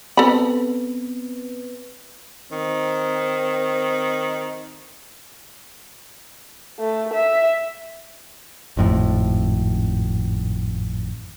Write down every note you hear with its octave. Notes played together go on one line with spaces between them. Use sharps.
B3 C4 A4 B4 B5
D#3 C4
A3
E5
G#1 F2 A2